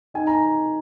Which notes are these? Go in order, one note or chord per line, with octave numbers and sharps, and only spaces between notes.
D#4 G#5
A#5